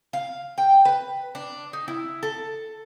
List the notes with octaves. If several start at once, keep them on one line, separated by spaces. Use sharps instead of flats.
F5
G5
B4
D4
D#4
E4
A4